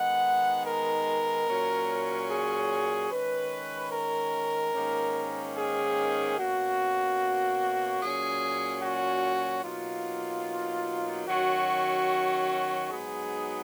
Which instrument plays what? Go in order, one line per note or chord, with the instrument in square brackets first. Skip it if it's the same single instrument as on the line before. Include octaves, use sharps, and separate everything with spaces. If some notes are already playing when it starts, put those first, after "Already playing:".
Already playing: [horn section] D#3 G#3 B3 D#4 F#5
A#4
A#2 F#3 C#4
G#4
D#3 G#3 C#4 B4
A#4
G#2 D#3 A#3 C#4
G#4
B2 A#3 C#4 F#4
A#2 F#3 C#4 G#4
F#4
B2 F#3 A#3 D#4 F4
D#3 F#3 C#4 F#4
G#2 F#3 B3 D#4 G#4